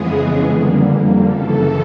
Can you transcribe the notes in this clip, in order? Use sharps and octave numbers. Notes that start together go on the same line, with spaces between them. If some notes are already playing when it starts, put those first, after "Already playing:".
Already playing: F2 C#3 E3 G#3 B3 G#4
F2 D3 G3 A#3
F#2 C#3 E3 A4